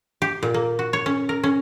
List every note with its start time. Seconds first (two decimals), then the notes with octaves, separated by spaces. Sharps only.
0.22 G4
0.43 A#2
0.54 A#3
0.79 F#4
0.93 C#5
1.06 C#4
1.29 A#4
1.43 C#4